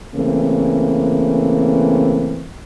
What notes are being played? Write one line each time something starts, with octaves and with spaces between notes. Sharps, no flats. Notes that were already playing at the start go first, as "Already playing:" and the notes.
C#3 E3 A3 A#3 C4